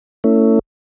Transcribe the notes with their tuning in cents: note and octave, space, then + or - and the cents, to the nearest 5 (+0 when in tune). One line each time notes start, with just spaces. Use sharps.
A3 +35 C#4 +15 E4 +0